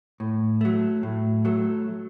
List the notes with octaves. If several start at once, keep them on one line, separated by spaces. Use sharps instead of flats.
A2
F#3 A3
A2
F#3 A3